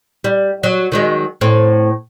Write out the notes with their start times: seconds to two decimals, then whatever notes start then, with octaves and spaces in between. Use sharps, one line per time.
0.24 G3
0.63 F#3
0.92 D#3 F#3 G#3
1.41 A2 C4